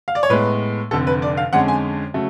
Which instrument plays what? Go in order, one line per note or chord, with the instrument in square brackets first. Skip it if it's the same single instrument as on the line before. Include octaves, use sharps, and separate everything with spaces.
[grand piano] F5
D5
C#5
A2 G#3 B3 B4
F1 F2 D3 A4
B4
D5
F5
F2 D3 G#3 C#4 F#5
G#5
C#3 F#3 A3